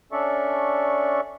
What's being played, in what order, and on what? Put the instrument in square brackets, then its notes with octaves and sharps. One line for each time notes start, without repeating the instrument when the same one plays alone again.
[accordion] C#4 D4 A4 D5 E5 C#6